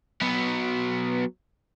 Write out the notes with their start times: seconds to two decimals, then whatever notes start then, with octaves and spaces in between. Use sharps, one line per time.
0.22 F#3 B3